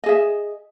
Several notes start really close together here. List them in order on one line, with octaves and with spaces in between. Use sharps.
D#5 G#4 E5